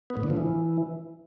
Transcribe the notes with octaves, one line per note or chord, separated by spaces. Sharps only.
B3
A2
D3
F3
E3